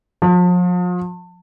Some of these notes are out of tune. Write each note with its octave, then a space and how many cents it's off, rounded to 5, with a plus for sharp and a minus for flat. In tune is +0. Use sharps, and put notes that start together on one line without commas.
F3 +40